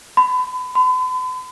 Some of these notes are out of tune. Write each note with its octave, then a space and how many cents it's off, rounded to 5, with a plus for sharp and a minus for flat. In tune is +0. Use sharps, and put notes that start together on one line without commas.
B5 +30
B5 +45